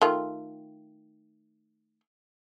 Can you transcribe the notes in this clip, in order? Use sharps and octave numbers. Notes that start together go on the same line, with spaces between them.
D#3 A3 F4